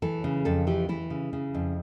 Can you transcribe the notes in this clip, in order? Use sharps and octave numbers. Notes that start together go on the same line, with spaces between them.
E3 A4
C#3
F2 A4
E3 G4
E3 E4
C#3
C#3
F2